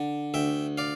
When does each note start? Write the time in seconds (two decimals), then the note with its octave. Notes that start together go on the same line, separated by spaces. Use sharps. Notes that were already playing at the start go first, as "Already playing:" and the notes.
Already playing: D3
0.34 D2 E5 G5
0.78 D5 F5